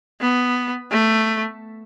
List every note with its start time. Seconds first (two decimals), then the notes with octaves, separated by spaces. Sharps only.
0.21 B3
0.91 A3